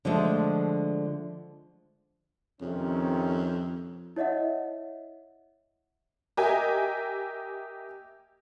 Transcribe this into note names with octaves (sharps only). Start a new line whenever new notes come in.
D3 F3 G#3 A3
F2 C3 D#3 C#4
E4 C#5 D#5 E5 F#5
G4 A#4 D#5 E5 G#5